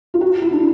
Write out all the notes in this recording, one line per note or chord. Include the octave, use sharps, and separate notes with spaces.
F4
F#4
E4
D4